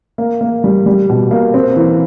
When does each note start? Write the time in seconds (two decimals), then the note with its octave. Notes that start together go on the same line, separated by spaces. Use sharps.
0.18 A#3
0.41 A#3
0.64 G3
0.86 G3
1.09 B2
1.31 A#3
1.54 C4
1.76 E3